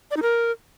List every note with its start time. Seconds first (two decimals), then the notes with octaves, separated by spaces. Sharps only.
0.11 D5
0.17 D#4
0.22 A#4